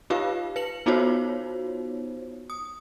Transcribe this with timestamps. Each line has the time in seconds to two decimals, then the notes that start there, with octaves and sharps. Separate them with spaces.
0.10 D#4 F4 G4 B4 F5
0.56 B4 C#7 F#7
0.86 B3 D#4 F4 F#4 C5 C#5
2.50 D#6